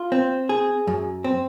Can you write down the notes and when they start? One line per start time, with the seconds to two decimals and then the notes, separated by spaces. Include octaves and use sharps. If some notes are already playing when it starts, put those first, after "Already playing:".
Already playing: F4
0.12 C4
0.49 G#4
0.87 F#2
1.24 C4